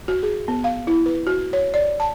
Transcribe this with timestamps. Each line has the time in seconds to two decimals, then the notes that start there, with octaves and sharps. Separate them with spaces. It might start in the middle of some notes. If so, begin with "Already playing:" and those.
0.08 F#4
0.23 G#4
0.48 B3
0.64 F5
0.87 E4
1.06 B4
1.27 F#4
1.53 C#5
1.74 D5
2.00 A5